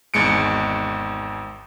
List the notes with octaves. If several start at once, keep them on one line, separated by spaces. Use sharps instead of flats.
G#1 E2 G#3 C#7 D7